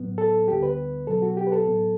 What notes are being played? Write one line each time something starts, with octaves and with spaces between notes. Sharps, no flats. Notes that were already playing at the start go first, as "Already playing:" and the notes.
Already playing: A2 F#3 B3
A4
D2 D3 G3 B3 G4
B4
B2 F#3 B3 A4
F#4
G4
B4
A4
A2 F#3 B3